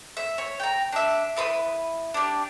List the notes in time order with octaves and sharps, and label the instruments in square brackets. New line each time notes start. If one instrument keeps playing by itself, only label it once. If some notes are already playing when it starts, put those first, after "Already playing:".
[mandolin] E5
C#5
G5 A#5
D4 E5
E4 B4 B5 D#6
D4 G4